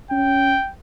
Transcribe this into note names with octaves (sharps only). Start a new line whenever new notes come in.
C#4 G5